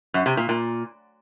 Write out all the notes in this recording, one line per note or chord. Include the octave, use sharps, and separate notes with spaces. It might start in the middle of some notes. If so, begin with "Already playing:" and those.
F#2
C3
A#2
A#2